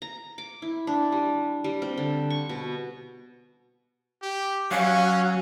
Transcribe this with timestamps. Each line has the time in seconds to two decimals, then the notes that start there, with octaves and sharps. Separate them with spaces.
0.02 A#5
0.38 D6
0.62 E4
0.87 D4
1.12 G3
1.64 G3
1.82 C4
1.98 D3
2.30 C#6
2.49 B2
4.22 G4
4.71 F#3 C#4 F5